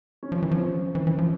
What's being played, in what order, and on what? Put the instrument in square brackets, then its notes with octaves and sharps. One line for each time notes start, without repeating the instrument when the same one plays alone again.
[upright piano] C#4
[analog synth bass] F3
E3
[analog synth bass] F3 [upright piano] C#4
[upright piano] C4
[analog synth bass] E3
E3
F3